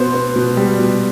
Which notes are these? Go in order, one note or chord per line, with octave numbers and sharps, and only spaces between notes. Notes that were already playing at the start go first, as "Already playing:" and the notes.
Already playing: B2 B3 C5
B3
B2
G3
B2